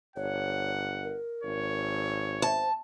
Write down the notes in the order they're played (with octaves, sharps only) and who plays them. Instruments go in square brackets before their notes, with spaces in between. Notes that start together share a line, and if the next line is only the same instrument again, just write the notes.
[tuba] G1 [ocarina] C#5 [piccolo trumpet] F#5
[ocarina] A#4
[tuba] G#1 [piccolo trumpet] C#5
[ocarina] C5 [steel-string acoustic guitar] A5